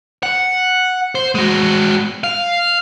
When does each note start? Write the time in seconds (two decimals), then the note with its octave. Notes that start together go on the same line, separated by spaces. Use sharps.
0.23 F#5
1.15 C5
1.35 G#3 F#4
2.24 F5